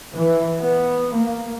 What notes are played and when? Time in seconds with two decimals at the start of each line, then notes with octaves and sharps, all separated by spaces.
0.13 E3
0.60 B3
1.13 A#3